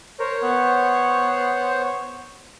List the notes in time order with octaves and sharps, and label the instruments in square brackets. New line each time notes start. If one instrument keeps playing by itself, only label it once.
[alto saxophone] A#4 [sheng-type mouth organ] C5 C#5
[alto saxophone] B3